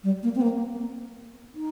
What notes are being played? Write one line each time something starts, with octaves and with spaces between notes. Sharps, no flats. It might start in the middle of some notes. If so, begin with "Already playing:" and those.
G3
A#3
C4
A#3
D#4